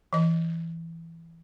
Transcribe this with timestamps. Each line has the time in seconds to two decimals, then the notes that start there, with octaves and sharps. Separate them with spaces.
0.13 E3 D#5